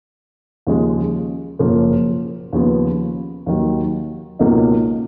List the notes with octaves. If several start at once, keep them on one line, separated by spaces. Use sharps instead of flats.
D#2 C#3 F3 G#3
F#1 F#2 C#3 F3 A#3
D#2 C#3 F3 B3
D#2 D#3 F#3
C#2 B2 A#3 D#4